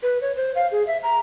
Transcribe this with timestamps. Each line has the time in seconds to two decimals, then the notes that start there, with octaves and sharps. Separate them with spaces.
0.03 B4
0.22 C#5
0.36 C5
0.56 F5
0.72 G#4
0.87 E5
1.03 A#5